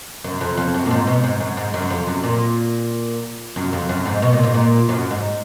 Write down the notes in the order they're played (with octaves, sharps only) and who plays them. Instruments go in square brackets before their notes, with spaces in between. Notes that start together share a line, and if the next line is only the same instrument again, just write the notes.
[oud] F#2
F2
F2
F#2
A#2
G#2
B2
G#2
F#2
G#2
F#2
F2
F#2
A#2
F#2
F2
F#2
G#2
B2
A#2
G#2
A#2
F#2
G#2